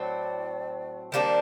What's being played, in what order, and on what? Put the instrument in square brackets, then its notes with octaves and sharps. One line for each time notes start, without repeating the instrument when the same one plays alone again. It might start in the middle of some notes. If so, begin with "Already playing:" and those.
Already playing: [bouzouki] A2 F#3 C4 [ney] D5
[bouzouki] D#3 G3 A#3 D4 [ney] C5